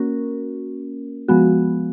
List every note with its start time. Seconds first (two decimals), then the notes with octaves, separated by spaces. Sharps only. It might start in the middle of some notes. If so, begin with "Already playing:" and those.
Already playing: A#3 C#4 F#4 A#4
1.28 F3 G#3 B3 F#4